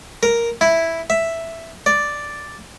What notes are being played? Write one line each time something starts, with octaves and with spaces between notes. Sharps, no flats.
A#4
E4
E5
D5